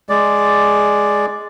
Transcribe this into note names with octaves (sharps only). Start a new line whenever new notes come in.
G#3 D5